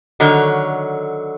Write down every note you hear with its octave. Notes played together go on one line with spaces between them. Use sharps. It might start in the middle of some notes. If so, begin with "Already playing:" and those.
D3 D#3 F#3 C#5